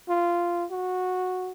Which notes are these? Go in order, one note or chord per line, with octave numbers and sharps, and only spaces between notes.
F4
F#4